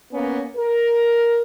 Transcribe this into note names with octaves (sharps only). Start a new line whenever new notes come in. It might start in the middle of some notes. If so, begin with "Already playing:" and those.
A#3 B3 C#4
A#4